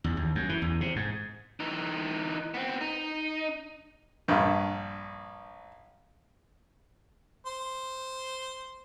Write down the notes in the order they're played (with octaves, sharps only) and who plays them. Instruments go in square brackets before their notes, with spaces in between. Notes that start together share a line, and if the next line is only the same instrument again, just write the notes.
[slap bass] E2
D#2
F#2
E3
E2
C3
G#2
[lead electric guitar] E3 D#4
B3 C4
D#4
[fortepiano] A#1 G2
[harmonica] C5